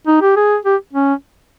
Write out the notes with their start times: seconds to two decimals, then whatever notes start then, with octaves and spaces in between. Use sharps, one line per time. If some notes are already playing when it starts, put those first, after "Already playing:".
0.07 D#4
0.22 G4
0.36 G#4
0.66 G4
0.93 C#4